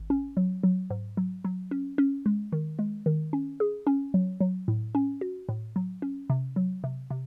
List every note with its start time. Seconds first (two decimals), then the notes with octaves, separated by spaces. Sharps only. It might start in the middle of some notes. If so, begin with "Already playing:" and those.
Already playing: G#1
0.10 C#4
0.37 F#3
0.63 F#3
0.90 G#2
1.17 F#3
1.45 F#3
1.71 C#4
1.98 C#4
2.26 G#3
2.52 D#3
2.79 G#3
3.06 D#3
3.33 C#4
3.60 G#4
3.87 C#4
4.14 F#3
4.41 F#3
4.68 A2
4.95 C#4
5.21 F#4
5.49 A2
5.76 F#3
6.02 C#4
6.30 C3
6.56 F#3
6.84 C3
7.11 C3